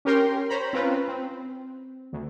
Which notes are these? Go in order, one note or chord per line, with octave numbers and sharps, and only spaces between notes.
C#4 G4 A#4 G5 C6
C5 C#5 A#5 B5
C4 C#4 F4 B4
C4
D2